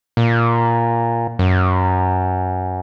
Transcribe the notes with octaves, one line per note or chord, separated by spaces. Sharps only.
A#2
F#2